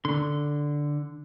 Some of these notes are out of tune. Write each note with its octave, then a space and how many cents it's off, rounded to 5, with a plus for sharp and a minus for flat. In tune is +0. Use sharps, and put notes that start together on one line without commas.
D3 +0 C6 -30